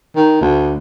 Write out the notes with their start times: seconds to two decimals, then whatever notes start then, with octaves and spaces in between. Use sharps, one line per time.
0.16 D#3
0.41 D2